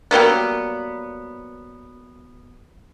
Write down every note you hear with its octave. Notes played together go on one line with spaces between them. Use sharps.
F#3 G3 A#3 B3